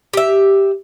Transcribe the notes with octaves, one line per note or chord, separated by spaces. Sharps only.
G4 E5